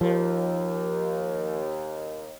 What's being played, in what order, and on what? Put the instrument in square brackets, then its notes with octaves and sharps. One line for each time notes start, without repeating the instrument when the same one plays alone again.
[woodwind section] D#2 [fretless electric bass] F3